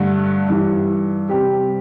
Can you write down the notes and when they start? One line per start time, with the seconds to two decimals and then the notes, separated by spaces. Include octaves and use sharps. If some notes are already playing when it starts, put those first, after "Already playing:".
Already playing: G2 D3 A3
0.49 G2 E3 G3
1.29 C3 G3 C4 G4